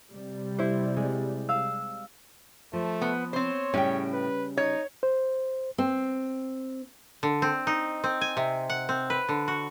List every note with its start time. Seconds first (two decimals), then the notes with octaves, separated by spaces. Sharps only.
0.12 C3 G3
0.59 E4 C5
0.96 G#3
1.49 F5 E6
2.73 F3 A3
3.01 B3
3.33 C4 C5 C#5
3.74 A2 C#3 G3 C#4 G5
4.13 B4
4.57 D#4 C#5
5.03 C5
5.78 C4
7.23 D3
7.42 C4
7.67 D#4
8.04 C4
8.21 G#5
8.37 C3
8.70 F#5
8.89 C4
9.10 B4
9.29 D3
9.48 F#4